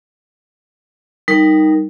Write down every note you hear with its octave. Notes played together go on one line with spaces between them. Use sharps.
G3 D#4 A#4